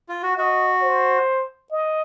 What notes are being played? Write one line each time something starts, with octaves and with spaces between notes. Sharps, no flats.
F4
F#4
F#4 D#5
C5
D#5